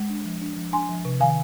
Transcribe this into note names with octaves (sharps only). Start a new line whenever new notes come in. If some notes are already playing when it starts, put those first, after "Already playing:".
Already playing: G#3
D4
F3
D4
F3
D4 G#5 C6
F3
C3
D#3 F5 G#5